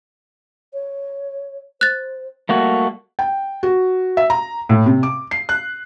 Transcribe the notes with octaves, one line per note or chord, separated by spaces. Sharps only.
C#5
C5 F#6 A6
G3 A3 A#3 F#4
G5
F#4
E5
A#5
A2
C3
D6
C7
F#6